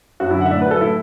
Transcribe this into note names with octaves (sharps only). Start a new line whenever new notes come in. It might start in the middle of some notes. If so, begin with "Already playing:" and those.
F#2 F#4
E4
D3
F#5
E5
A2 D5
F#3 B4
A4
A2 E4